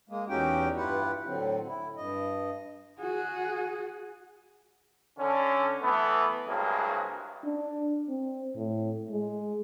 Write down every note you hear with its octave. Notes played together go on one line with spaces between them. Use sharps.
G#3 A#3
E2 C#4 D#4 F#4 G4 G5
G2 E4 F4 G4 B4 F#5
A2 D3 F#3 C4
E4
G2 D#5
F#4 G#4
D3 C#4
E3 A3 B3
C2 G2 F#3 G#3 A#3
D4
C4
A2
G#3